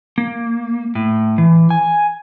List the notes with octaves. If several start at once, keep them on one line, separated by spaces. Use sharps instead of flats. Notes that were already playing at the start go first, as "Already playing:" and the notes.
A#3
A2
E3
G#5